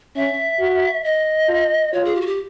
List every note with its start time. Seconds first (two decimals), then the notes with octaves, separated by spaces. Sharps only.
0.16 C#4 E5
0.60 F#4
1.04 D#5
1.49 F4
1.93 F4 C#5
2.05 G#4
2.15 G4
2.21 F#4
2.27 G4